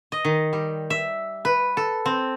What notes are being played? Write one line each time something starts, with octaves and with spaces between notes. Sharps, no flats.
D#5
D#3
G3
E5
B4
A4
C4